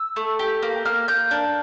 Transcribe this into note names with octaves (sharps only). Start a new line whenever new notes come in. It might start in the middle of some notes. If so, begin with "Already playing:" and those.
Already playing: E6
A3
G4
A#3
A#3 F6
A#3 G6
D4